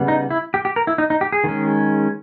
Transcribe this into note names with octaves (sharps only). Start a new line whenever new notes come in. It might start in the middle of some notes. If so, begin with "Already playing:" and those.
Already playing: C#3 G3 B3
D#4
E4
G4
G4
A#4
E4
D#4
D#4
G4
G#4
D#3 G#3 C#4